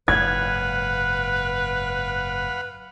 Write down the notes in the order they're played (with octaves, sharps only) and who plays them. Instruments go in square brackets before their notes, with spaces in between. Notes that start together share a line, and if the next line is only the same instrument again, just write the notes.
[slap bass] F#1 G#2 [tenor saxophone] B4 [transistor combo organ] F5 F#5 B5 [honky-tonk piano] G#6